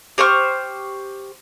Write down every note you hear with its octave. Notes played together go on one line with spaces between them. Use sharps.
G4 C5 C#6 F6